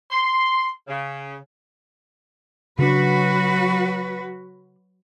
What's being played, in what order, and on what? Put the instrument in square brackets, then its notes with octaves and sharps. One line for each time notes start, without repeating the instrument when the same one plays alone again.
[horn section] C6
C#3
[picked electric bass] C#3 D4 [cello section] F#3 F#4 B4